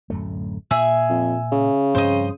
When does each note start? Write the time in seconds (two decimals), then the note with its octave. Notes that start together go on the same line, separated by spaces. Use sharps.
0.10 D1 F#2 A3
0.71 A#2 G#4 E5
1.10 F2
1.52 C#3
1.95 G2 F3 C4 C5 D#5